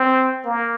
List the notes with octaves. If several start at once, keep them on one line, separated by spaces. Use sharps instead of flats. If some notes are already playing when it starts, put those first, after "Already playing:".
Already playing: C4
A#3